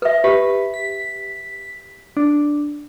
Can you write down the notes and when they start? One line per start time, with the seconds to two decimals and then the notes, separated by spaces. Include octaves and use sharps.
0.02 B4 E5
0.24 G4 B4
0.74 B6
2.17 D4